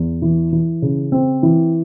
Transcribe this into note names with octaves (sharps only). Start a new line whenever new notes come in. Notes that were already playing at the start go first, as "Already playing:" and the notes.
Already playing: E2
E3
E3
C#3
C4
E3